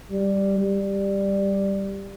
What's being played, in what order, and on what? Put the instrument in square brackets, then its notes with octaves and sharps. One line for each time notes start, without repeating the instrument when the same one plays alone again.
[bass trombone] G3
G3